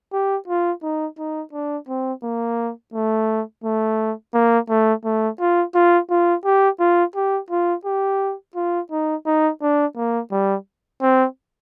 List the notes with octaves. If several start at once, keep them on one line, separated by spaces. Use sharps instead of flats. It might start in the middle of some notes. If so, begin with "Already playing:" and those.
G4
F4
D#4
D#4
D4
C4
A#3
A3
A3
A#3
A3
A3
F4
F4
F4
G4
F4
G4
F4
G4
F4
D#4
D#4
D4
A#3
G3
C4